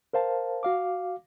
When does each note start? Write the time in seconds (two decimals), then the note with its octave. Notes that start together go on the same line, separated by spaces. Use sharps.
0.13 A#4 C5 F5 A5
0.63 F#4 F5 D6